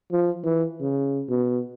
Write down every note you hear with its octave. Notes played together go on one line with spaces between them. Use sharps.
F3
E3
C#3
B2